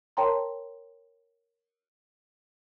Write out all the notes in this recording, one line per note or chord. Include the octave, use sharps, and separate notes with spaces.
A#4 C#5 G5 A5 A#5 C6